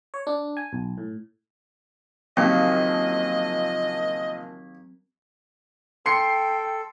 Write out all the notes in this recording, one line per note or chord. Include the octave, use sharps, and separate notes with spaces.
C#5
D4
G#5
B1
A2
F#1 D#2 F3 F#3 C4 F4 D#5
A4 G5 C6 C7 C#7